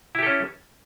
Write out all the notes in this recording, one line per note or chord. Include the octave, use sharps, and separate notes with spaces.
C#4 E4 G4 A4